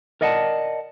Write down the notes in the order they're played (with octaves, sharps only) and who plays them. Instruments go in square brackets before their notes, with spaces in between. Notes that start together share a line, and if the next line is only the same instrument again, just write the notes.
[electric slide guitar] A#4 D5 D#5 F#5 G#5 A5